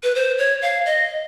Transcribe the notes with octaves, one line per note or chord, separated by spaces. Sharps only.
B4
C5
C#5
F5
D#5